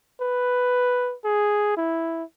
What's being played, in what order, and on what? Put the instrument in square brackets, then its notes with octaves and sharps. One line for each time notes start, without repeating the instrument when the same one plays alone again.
[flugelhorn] B4
G#4
E4